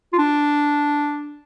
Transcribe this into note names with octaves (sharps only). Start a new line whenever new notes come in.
F4
D4